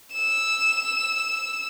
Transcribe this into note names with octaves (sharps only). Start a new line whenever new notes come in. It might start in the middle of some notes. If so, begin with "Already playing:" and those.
E6 E7